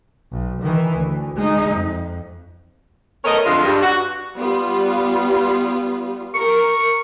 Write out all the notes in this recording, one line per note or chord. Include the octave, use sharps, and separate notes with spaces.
B1
D#3 E3
D2
G#3 D#4
F2
A3 B3 A4 A#4 C#5 D#5
F2 D3 G#3 F4
G2
F#4
G3 B3 F4
A#4 C#6